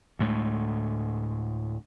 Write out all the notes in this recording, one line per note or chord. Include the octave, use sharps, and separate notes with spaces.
D2 A2 G#3 A3